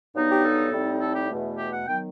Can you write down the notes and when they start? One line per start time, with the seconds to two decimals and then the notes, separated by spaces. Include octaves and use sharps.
0.14 G2 F#3 B3 D#4
0.29 G4
0.43 A4
0.72 A2 G3 C4 D#4
1.01 A4
1.15 G4
1.29 E2 B2 A3
1.58 G4
1.72 F#5
1.86 D#3 F#3 B3 G5